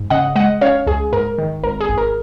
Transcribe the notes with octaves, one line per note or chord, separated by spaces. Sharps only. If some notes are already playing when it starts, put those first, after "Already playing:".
Already playing: G#2
C#3 D#5 F#5
G#3 D#5 F#5
C#4 C#5 F5
C#2 G#4
G#2 A#4
D#3
G#1 A#4
G#4
G#1
A#4